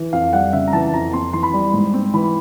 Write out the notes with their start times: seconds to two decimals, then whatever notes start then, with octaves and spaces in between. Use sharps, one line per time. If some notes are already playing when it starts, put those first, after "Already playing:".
Already playing: E3
0.13 F2 F5
0.33 G3 F#5
0.53 C#3 E5
0.67 A#5
0.73 E3 A5
0.93 F2 A#5
1.13 C4 C6
1.33 E3 C6
1.43 B5
1.54 G3
1.74 G#2
1.94 C4
2.14 E3 B5